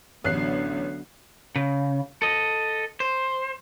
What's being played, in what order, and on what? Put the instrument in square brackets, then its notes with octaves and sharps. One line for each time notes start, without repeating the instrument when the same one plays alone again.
[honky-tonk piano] A1 F#6 C7 [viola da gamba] D3 F#3 B3
[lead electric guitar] C#3
A4 D#5
C5